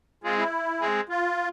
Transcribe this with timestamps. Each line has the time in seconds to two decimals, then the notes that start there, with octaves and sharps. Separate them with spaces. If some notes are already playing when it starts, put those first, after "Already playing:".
0.24 G#3 C4 F4 G#4
0.38 E4
0.80 G#3 C4 G#4
1.09 F4